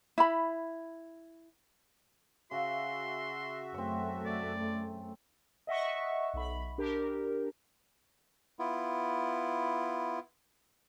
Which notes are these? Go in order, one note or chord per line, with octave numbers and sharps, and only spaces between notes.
E4 B5
C#3 F#4 E5 C6
F#2 A3 C4 C#5
D5
D#5 E5 F#5 C#6
B1 B5
D4 G4 A#4
B3 E4 F4